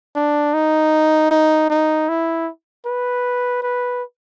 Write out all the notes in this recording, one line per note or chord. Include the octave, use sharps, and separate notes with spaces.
D4
D#4
D#4
D#4
E4
B4
B4